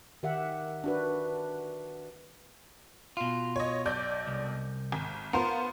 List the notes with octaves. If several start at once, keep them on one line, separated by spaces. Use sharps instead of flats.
D#3 G4 E5 F#5
D4 F#4 B4
B2 F4
C#5 D#5
B1 D5 G6
C2
G#1
B3 F4 A#4 C5